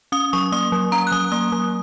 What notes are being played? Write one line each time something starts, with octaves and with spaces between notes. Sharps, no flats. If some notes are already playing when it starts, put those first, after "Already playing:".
C#4 D#6
F#3 C#6
A#3 D#6
F#3
C#4 A#5
F#6
F#3 D#6
A#3 D#6
F#3 D#6